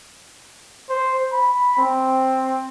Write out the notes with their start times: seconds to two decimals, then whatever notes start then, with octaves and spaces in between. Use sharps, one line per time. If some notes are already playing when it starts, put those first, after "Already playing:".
0.89 C5
1.32 B5
1.77 C4